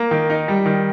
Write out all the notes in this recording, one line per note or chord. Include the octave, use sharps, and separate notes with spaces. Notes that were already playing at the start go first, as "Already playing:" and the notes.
Already playing: A#3
D#3
D#4
G3
D#3